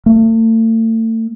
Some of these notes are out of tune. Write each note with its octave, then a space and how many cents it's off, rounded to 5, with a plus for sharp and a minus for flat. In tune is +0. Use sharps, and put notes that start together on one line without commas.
A3 +40